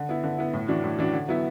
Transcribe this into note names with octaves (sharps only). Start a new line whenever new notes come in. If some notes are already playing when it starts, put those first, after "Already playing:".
Already playing: D3
B3 E4
D3
B3 E4
A2
E3 D4 F#4
A2
E3 D4 F#4
D3
F#3 B3 E4